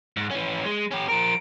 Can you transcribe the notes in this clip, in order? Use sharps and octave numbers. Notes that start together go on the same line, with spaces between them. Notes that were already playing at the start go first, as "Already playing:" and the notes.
G#2
E3 C#4
G#3
C#4 G4
F3 A#4 D7